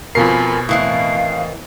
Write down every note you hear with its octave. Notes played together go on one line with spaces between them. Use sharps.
F2 B2 F4 A#4 G#5 B5 C7
A2 D#3 E3 C4 F5